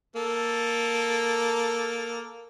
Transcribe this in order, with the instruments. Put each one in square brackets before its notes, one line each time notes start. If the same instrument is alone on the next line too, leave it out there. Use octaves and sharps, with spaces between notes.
[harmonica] A#3 A4